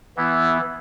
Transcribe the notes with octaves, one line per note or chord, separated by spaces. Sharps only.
E3 B3 E4